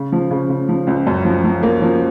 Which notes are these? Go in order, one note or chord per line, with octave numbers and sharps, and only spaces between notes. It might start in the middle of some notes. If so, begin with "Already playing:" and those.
Already playing: C#3
F3
C#3
C#3
F3
C#2
F#2
F3
F3
A#3
F3